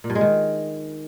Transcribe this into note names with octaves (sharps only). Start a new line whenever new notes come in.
A#2
G2
G#3
D#3